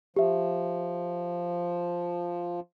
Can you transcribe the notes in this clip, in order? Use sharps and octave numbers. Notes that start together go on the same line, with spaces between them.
F3 G4 E5